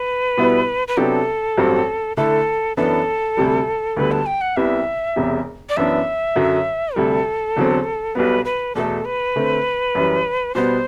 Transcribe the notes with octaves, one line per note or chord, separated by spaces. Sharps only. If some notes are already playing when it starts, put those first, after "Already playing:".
Already playing: B4
B2 G3 B3 E4
B4
C3 F#3 B3 D4 G4 A4
A1 G2 F#3 C4 F#4
D3 A3 E4 A4
F#2 E3 B3 D4 A4
D2 C3 G3
D2 D3 G3 B3 B4
A5
G5
F#5
C2 C3 G3 B3 E4 E5
E1 E2 C3
D5
F#2 E3 B3 D4 E5
F#2 D3 F#3
D2 C3 G3 A4
E2 D3 F#3 C4
B1 B2 G3 B3 B4
B4
E2 B2 A3 A4
B4
D3 A3 C4
F#2 E3 G3
B2 G3 B3 C5